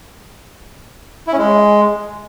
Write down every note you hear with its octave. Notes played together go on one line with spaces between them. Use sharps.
E4
C#4
G#3